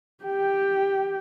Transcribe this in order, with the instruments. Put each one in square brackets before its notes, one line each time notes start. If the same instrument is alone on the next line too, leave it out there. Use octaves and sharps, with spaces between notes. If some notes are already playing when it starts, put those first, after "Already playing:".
[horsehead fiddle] G4 G5